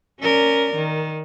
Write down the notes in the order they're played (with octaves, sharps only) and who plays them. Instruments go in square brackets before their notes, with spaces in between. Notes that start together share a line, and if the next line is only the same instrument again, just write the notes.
[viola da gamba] C#4 A#4 D5
D#3